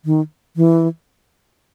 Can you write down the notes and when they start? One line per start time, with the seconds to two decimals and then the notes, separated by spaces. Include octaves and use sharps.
0.05 D#3
0.56 E3